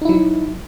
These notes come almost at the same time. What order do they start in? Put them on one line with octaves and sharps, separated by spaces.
D#4 E4 F#3